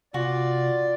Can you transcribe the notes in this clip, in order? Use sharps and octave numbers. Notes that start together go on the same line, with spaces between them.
C3 F4 F#4 D5